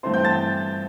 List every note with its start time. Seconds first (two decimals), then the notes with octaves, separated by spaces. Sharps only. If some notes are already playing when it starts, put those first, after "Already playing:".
0.03 G2 E3 A3 C4 C5 C6
0.14 G5 G6
0.25 A5 A6